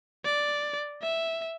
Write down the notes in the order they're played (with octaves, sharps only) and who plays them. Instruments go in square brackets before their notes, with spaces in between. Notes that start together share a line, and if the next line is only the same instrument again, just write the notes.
[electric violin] D5
E5